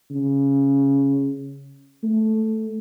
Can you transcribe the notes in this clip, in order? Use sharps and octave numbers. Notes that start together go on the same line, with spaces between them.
C#3
A3